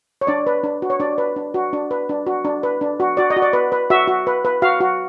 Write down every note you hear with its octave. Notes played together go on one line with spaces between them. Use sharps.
C#5
D4 D5
B4
D4
F#4
C#5
D4 D5
B4
D4
F#4
D4
B4
D4
F#4
D4
B4
D4
F#4
F#4 D5
D#5
F#4
D5
B4
B4
F#4 E5
F#4
B4
B4
F#4 F5
F#4